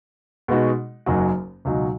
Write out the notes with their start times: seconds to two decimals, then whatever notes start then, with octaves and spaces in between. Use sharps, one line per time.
0.48 B2 G#3 B3 D#4 F#4
1.06 F#1 F#2 F#3 D#4 F#4
1.65 C#2 B2 F#3 D#4 F#4